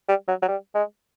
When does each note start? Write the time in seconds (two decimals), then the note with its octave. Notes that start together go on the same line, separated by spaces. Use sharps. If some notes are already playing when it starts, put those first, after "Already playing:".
0.08 G3
0.28 F#3
0.42 F#3
0.48 G3
0.75 G#3